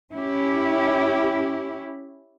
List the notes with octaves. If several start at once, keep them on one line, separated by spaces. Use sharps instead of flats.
C#4 E4 G4